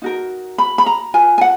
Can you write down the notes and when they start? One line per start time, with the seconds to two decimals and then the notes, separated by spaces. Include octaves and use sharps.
0.02 D#4 F#4 A#4
0.58 B5
0.78 B5
0.86 A#5
1.14 F4 B4 G#5
1.38 G#5
1.41 F#5